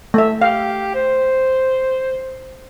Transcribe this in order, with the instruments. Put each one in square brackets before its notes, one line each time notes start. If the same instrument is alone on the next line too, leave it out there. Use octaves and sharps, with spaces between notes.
[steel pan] A3 E5
[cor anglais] G4 [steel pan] F5
[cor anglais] C5